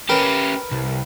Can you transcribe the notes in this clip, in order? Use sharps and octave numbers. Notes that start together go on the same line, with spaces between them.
C#4 G4 A#4 B4
C2